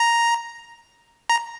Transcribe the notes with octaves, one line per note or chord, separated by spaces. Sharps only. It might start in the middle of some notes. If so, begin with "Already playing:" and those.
Already playing: A#5
A#5